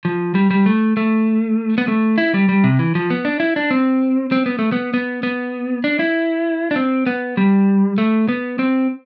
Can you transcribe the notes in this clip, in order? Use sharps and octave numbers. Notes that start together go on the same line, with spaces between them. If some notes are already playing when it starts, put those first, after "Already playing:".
F3
G3
G3
A3
A3
B3
A3
E4
G3
G3
C3
E3
F3
B3
D4
E4
D4
C4
C4
B3
A3
B3
B3
B3
D4
E4
D4
C4
B3
G3
A3
B3
C4